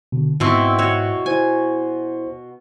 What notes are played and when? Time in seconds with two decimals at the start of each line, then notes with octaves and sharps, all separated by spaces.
0.12 B2 D3
0.40 G#2 B2 C4 E4 C#6 E6
0.79 F#4 C#5
1.26 E4 C5 G#5